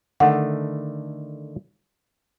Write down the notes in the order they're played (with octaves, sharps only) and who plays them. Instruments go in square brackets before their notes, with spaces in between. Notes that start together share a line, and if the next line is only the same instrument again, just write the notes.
[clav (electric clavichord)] D3 D#3 A3 [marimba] F#5